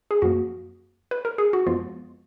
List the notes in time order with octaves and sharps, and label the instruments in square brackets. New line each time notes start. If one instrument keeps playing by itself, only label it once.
[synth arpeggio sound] G#4
F#2 F3 A#3 F#4
B4
A#4
G#4
F#4
F#2 F3 G#3 B3 F4